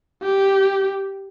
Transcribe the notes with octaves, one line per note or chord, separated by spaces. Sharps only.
G4